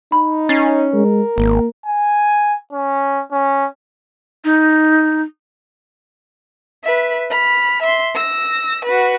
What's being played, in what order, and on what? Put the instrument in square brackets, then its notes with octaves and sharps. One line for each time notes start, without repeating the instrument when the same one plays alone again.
[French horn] D#4 [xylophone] B5
[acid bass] C#4 [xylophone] A6 C7
[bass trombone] G#3 [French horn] A#4
[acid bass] G#1 [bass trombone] A#3
[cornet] G#5
C#4
C#4
[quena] D#4
[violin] B4 E5
B5 F6
E5 C6
E6 A#6
F#4 B4